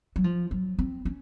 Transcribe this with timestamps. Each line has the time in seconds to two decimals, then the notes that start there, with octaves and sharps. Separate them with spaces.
0.16 F#3
0.24 F3
0.51 F#3
0.79 C4
1.05 C#4